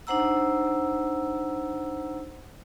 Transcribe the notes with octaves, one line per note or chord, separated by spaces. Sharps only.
D4 D#4 C5 F#5 A#5 E6